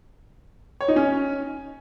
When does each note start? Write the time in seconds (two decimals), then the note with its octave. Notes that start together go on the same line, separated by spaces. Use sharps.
0.81 C#5
0.88 D#4
0.96 C#4